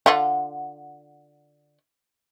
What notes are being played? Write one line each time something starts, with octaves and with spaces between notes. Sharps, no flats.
D3 F4 F#5